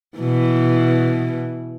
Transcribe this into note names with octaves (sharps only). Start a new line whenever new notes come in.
B2 E3